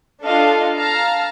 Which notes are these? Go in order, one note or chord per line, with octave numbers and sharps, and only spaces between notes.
D4 F4 A4 D#5 F5
F5 A5 A#5 F6